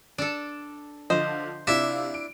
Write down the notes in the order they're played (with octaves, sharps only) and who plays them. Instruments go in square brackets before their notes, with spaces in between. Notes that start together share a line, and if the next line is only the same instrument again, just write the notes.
[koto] D4 A4
[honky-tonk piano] D3 F3 [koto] C5 [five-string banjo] D#5
[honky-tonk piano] C3 F4 [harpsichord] D4 E4 [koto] E5
[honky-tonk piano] D7